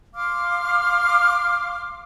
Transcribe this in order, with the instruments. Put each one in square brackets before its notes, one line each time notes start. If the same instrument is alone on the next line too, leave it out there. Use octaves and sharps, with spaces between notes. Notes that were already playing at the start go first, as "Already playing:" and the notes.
[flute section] F5 C6 D6 F6